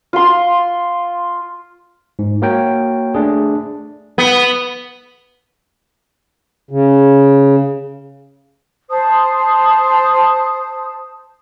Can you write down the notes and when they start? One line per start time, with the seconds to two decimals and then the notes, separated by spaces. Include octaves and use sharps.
0.13 F4 C6
2.19 G#2
2.42 A#3 F#4 A#4 C#5 G5
3.15 A3 D4 G#4
4.18 B3
6.71 C#3
8.90 C5 A5 D#6